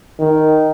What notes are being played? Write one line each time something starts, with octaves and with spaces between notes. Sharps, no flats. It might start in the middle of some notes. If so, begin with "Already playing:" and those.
D#3